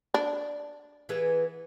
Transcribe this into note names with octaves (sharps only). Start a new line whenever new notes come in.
D4
E3 B3 G#4